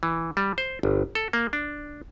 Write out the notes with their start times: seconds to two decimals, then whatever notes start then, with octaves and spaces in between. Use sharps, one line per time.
0.03 E3
0.37 G3
0.58 C5
0.83 G1
1.15 A4
1.33 A#3
1.53 D4